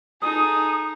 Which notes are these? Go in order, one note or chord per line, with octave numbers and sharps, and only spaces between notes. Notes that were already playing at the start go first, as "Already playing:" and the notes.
D#4 G#4 A4 D#6